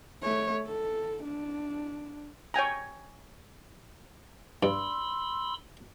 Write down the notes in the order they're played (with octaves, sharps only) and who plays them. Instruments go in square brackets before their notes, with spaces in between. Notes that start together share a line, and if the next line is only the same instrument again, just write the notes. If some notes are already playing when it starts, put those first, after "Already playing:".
[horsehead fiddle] A3 C#5
A4
D4
[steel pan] C#5 G5 G#5 A#5
[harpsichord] G2 [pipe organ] B5 C6 E6